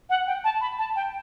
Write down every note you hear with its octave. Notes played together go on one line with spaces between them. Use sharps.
F#5
G5
A5
B5
A5
G5